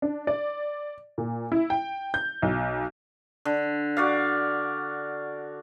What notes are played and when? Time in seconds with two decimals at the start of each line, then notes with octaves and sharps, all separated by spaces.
0.02 D4
0.27 D5
1.18 A#2
1.52 E4
1.70 G5
2.14 G6
2.42 B1
3.45 D3
3.97 F#4 D5 F5